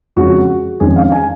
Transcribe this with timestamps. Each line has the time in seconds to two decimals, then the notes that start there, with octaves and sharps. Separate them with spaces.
0.16 F2 C#3 G#3 C#4 F#4
0.80 F2 D#3 G#3 C#4 G#4
0.96 F5
1.12 G#5